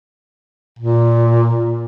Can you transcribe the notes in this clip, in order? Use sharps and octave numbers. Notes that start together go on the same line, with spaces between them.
A#2